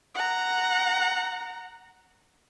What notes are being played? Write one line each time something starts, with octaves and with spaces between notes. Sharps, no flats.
F#5 A#5